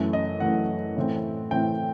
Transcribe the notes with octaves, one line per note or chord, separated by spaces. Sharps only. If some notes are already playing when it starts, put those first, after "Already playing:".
Already playing: F#2 E3 A3
D#5
F#2 E3 A3 F#5
A2 E3 A3 C4
A2 E3 A3 C4 G5